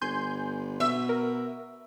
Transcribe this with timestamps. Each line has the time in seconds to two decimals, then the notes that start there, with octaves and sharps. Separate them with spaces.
0.01 G1 G#5 C6 G6
0.80 B2 E5
1.09 A#4